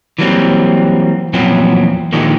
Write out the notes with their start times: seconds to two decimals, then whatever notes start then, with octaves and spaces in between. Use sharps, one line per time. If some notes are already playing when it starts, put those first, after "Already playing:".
0.19 E3 F#3 G3 A#3 C4
1.33 E2 A#2 F3 F#3 B3 C4
2.13 A#2 D3 D#3 F3 G#3 G4